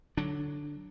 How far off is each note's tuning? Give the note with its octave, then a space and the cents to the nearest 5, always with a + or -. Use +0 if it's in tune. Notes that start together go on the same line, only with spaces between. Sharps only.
D3 +0 F#3 +10 D4 +0